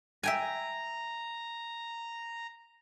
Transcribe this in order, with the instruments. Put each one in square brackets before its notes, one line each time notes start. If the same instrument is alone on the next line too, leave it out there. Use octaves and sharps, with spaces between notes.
[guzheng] E5 G5 G#5 [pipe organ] A#5